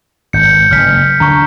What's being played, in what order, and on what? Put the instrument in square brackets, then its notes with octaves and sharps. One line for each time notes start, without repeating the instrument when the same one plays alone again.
[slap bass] G#1 [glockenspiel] G6 C#7
[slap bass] F#1 [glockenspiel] F6 B6
[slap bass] D2 D3 D4 [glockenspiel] A#5 C#6